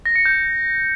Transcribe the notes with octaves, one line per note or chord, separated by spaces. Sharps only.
A#6
C#7
G6